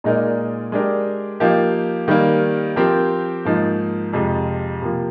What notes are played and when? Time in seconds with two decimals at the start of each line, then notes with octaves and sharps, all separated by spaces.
0.04 A#2 G#3 D#4 A#4 D5
0.72 G#3 D4 G4 A#4
1.40 F3 A#3 D#4 G4
2.08 D#3 G3 A#3
2.76 F3 C4 G4 A#4
3.45 G#2 F3 A#3 D#4
4.13 F2 C3 F3 G#3
4.82 C3 F3 A#3